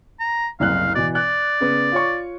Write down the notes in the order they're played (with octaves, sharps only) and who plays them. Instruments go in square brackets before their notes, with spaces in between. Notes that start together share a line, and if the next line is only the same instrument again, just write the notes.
[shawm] A#5
[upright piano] F#1 C2 F#6 [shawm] F5
[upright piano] B2 E3 [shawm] D5
[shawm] D5 [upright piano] F#6
[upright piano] C#3 B3
F4 C#5 C#6